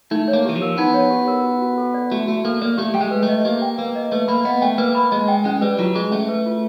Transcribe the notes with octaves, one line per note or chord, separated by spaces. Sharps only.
A3 D#4
C#5
A#3
E3 G4
F3
A#4
B3 D#4
C#5
G4
A#4
F#4
F#4
A4
D5
A3 F#4
A3 F#4
A#3 A4
A#3 D5
A3 G4
G3 G5
G#3
B4
A3
D#5
A#3 G4
G5
A#3 B4
D#5
A3 B4
A#3 B5
B3 D#5
A3 G5
A#3 B4
B5
G#3 D#5
G5
G#3 C#4
G3 B4
F#3 F4
G#3 G#4
A3 C#4
B4
F4